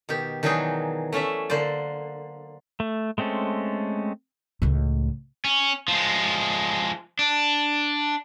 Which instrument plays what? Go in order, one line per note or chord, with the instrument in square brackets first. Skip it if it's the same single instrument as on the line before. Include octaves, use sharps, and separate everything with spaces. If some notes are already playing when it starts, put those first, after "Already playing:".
[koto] B2 D#3 G4
D#3 E3 F#3 D4 D#4 G#4
A3 C#4 D5 E5
D3 A#3 C5 D5
[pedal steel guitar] A3
G#3 A3 C4 C#4 A4
[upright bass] C#2 A2
[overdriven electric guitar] C#4
F3 G#3
D4